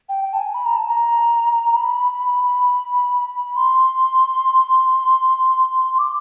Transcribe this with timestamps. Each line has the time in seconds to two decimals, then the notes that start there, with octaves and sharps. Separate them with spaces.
0.09 G5
0.24 G5
0.33 A5
0.39 G#5
0.54 B5
0.65 A#5
0.76 A5
0.88 A#5
1.75 B5
3.56 C6
5.98 D6